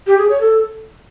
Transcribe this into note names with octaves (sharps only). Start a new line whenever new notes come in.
G4
G#4
C#5
A4